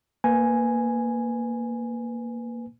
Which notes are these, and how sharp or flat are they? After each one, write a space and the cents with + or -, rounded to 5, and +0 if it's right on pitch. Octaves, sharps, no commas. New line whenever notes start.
A#3 +0 B4 +15 G#5 +0